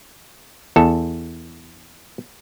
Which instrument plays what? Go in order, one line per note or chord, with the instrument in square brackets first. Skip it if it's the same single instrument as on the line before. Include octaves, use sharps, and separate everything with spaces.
[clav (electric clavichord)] E2 A4